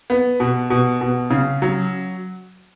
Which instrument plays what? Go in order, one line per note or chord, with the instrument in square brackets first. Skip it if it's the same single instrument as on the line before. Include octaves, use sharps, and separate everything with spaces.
[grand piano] B3
B2
B2
B2
C#3
F#3